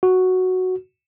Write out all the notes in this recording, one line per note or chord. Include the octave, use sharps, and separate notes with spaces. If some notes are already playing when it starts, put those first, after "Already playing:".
F#4